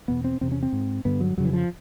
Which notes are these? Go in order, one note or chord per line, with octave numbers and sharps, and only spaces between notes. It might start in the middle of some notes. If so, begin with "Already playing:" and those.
E2 B2 B3
C4
E2 C3 C4
C#4
C4
G#2
G2 D3 B3
F#3
F2 C#3 F#3
E3
F3